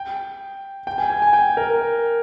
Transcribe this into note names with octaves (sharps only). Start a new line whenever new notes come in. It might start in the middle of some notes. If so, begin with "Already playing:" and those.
Already playing: G5
G5
G#5
G#5
G#5
G5
A#4